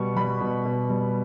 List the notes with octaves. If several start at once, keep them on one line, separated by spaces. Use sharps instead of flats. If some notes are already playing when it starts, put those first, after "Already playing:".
Already playing: B2 G3 C#6
G3 B5
B2
B2
G3